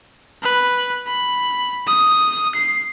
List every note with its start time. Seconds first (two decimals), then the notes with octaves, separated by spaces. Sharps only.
0.43 B4
1.07 B5
1.87 D#6
2.55 C7